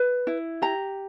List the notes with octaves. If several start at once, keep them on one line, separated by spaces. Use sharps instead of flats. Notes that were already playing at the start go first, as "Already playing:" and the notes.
Already playing: B4
E4
G4 A#5